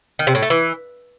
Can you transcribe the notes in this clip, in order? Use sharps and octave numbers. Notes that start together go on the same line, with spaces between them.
D#3
C3
A2
A3
E3